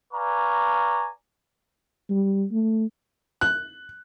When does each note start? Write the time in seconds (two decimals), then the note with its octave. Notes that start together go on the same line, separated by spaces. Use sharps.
0.14 B4 D5 F5 G#5 A#5 C#6
2.10 G3
2.52 A3
3.41 F#6